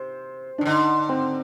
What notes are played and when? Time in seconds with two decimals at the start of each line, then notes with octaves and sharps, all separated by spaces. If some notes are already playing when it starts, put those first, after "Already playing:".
Already playing: C3 C5
0.58 D4
0.61 D#3
0.65 D3 D#4
1.09 C4